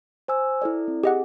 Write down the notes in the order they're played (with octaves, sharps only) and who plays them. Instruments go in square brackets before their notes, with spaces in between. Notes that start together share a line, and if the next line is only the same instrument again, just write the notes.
[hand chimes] C5 G#5 E6
E4 A4 D5
C4
[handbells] G4 D#5 F#5 [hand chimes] G#4